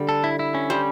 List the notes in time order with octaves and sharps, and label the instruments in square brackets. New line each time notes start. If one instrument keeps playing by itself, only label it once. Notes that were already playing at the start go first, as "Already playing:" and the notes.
Already playing: [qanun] D3 G3
[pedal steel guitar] A4
E4
E4
C#4
[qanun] G3 [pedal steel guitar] C5